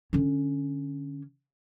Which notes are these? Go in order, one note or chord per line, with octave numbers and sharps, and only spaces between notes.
D3 C#4